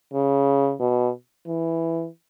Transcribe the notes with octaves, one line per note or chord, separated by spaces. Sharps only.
C#3
B2
E3